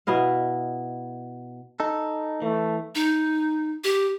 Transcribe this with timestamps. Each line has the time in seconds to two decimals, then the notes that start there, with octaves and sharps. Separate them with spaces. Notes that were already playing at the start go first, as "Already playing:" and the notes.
0.07 B2 E4 D#5 F5
1.80 D#4 A4
2.42 E3 A3
2.95 D#4
3.84 G4